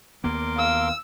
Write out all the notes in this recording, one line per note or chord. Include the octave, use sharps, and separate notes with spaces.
D#2 A#3 B3 A#4 C6 D6
F5 E6